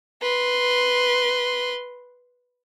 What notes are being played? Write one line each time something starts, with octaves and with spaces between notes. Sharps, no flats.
B4 C6